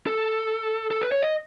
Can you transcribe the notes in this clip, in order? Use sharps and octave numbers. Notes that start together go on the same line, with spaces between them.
A4
A4
B4
C#5
D#5